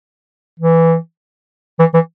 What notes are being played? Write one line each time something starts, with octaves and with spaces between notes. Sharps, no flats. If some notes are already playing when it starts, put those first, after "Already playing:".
E3
E3
E3